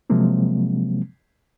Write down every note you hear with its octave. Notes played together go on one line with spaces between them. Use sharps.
C3 F3 F#3 G#3 A#3 C4